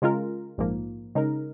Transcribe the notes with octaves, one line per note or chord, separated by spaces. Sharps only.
C#3 G#3 F4 A#4
A#1 G#2 F3 A#3
C#3 G#3 D#4 A#4